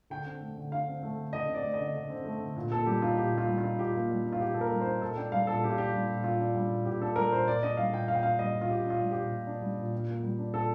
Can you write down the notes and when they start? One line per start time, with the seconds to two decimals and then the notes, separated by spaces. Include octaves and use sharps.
0.10 D3 G5
0.25 C4
0.41 A3
0.57 D3
0.72 D3 F5
0.88 C4
1.03 A3
1.18 D3
1.33 D3 D#5
1.48 C4
1.54 D5
1.63 A3
1.74 D#5
1.80 D3
1.95 D3
2.10 C4
2.25 A3
2.41 D3
2.56 A#2
2.71 A#3 A4
2.86 G3 G4
3.02 D#4 F4
3.17 A#2 G4
3.32 A#3
3.38 F4
3.48 G3
3.58 F4
3.64 D#4
3.78 A#2 G4
3.95 A#3
4.10 G3
4.25 D#4
4.32 F4
4.40 A#2 G4
4.54 A#3 A4
4.61 A#4
4.71 G3
4.81 C5
4.86 D#4
5.01 A#2 A4
5.17 D4 G5
5.32 G3 F5
5.47 A#2 A4
5.64 A#2 G4
5.70 F4
5.78 D4 G4
5.93 G3
6.09 A#2
6.24 A#2 F4
6.40 D4
6.55 G3
6.70 A#2
6.85 A#2 G4
7.01 D4 A4
7.16 G3 A#4
7.31 A#2 C5
7.48 A#2 D5
7.63 D4 D#5
7.77 G3 F5
7.92 A#2 G5
8.08 A#2 F5
8.15 G5
8.23 D4 F5
8.39 G3 D#5
8.54 A#2
8.61 F4
8.70 A#2 G4
8.85 D4
8.90 F4
9.01 G3
9.11 G4
9.16 A#2
9.31 A#2
9.47 D4
9.62 G3
9.77 A#2
9.92 A#2
10.08 A#3
10.23 G3
10.39 D4
10.54 A#2 A4